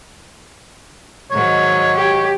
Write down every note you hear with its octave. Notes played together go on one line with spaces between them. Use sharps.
G#2 D#3 F#3 C#5
G4